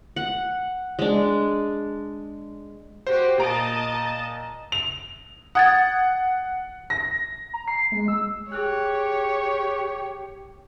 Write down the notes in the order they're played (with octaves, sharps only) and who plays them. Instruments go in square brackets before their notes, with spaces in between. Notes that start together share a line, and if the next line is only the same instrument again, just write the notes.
[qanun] F#5
G#3 D4
[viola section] F#4 G4 [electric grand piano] C5
[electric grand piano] A#2 A#5 D7 [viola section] D#5 A5
[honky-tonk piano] F7
[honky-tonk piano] F#5 [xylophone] D#6 G#6 A6
[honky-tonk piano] A#6
[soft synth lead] A#5
C7
G#3
E6
[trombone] G4 [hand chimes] G#4 F6 F#6 [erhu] C#5